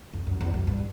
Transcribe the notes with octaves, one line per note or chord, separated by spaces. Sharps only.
F2
F#2
E2
F#2
G2